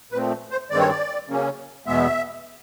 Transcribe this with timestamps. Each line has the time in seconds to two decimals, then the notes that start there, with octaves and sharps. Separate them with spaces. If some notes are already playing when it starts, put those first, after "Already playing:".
0.12 A#2 F3 A3 C4 B4
0.51 C5
0.70 G2 D#3 G#3 C4 D5
0.79 C#5
0.89 D5
1.28 C#3 F#3 A#3 C#4
1.86 E2 B2 G#3 B3 E5